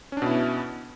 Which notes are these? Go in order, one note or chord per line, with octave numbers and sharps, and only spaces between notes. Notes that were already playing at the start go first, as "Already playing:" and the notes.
B2 B3 C#4 D4 E4